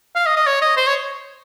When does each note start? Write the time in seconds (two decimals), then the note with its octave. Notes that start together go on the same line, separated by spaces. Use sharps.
0.16 F5
0.26 D#5
0.36 D#5
0.47 C#5
0.62 D#5
0.77 C5
0.87 C#5